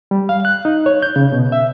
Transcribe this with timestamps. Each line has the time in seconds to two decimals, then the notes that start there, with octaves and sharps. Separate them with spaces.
0.11 G3
0.29 F5
0.45 F#6
0.65 D#4
0.86 C#5
1.02 G6
1.16 C#3
1.32 B2
1.52 E5